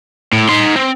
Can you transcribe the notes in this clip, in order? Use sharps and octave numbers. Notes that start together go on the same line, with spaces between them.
A2
D#4 C6
C4